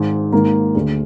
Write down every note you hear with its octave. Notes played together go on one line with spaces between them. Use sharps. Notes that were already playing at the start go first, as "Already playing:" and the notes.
Already playing: G#1 G#2 D#3 G#4
G#1 G#2 D#3 A#3 A#4
D2 D3 G#4